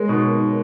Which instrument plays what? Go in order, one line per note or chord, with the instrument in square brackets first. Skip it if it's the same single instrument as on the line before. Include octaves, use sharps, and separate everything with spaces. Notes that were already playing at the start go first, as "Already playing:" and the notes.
Already playing: [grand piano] G#3 [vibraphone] A#4 C#5
[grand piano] B2 [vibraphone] D#4